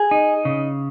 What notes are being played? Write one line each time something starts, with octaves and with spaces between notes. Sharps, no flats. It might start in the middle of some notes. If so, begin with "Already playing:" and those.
Already playing: G#4
D#4
C#3